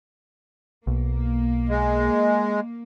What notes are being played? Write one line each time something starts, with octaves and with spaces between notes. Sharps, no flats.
B1 A#3
G#3